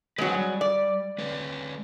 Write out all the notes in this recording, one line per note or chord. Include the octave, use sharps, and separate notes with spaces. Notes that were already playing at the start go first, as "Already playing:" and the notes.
F#3 G#3 C4 B4
G3
D5
G#3 B4 C#5